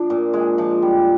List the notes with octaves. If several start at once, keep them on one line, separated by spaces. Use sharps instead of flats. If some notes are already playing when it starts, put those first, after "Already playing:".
Already playing: F3 D4
A#2
G#3
F3
G3